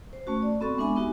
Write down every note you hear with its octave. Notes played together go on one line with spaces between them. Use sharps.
C5
A3 C#4 F#4
D5
B3 C4 F#4 A4 B5 C#6
G#3 B3 D4 E5 G#5 B5
B3 D#4 F#4 G4